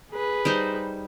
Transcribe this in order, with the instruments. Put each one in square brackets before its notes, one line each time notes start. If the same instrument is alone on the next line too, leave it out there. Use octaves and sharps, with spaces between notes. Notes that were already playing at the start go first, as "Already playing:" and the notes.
[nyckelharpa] G#4 B4
[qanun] G3 D#4 C5